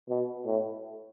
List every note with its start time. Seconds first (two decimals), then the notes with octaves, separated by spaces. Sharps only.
0.10 B2
0.46 A2